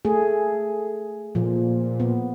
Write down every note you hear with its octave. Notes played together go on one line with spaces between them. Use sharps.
A3 G#4
A#2 F3
B3